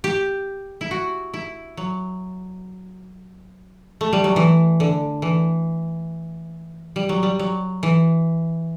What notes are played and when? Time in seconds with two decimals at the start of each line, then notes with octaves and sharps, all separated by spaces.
0.04 G4
0.81 E4
0.91 F#4
1.34 E4
1.77 F#3
4.01 A3
4.13 G3
4.24 F#3
4.36 E3
4.80 D3
5.22 E3
6.96 G3
7.09 F#3
7.23 G3
7.39 F#3
7.83 E3